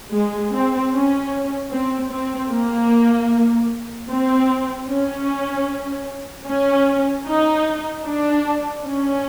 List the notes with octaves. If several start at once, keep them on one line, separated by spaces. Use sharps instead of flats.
G#3
C4
C#4
C4
C4
A#3
C4
C#4
C#4
D#4
D4
C#4